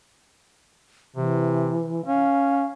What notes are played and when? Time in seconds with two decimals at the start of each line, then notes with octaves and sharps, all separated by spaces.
1.16 C3 E3
2.06 C#4 F5